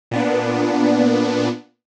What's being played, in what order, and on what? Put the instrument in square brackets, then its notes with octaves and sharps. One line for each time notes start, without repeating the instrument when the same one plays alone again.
[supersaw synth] A#2 B3 D4